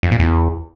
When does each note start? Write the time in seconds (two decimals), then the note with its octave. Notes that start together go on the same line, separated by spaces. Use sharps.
0.03 F2
0.11 A#2
0.20 E2